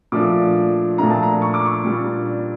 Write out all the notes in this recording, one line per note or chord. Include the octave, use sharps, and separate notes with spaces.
A#2 F3 A3 D4 D6
A#2 F3 A3 D4 A#5
A5
A#5
C#6
D6
C#6
A#2 G3 D4